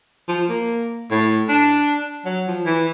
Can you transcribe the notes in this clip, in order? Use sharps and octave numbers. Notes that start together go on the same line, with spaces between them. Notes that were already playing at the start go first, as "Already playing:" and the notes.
F3
A#3
A2
D4
F#3
F3
E3